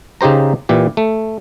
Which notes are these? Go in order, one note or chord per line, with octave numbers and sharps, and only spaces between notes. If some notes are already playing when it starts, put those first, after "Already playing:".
C#3 D#4 G4 C5 A#5
A#2 E3 G4
A3